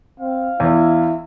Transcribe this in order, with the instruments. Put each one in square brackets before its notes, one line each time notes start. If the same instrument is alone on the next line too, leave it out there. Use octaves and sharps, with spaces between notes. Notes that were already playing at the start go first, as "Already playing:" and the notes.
[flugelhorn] C4 [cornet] F5
[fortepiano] E2 [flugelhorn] E4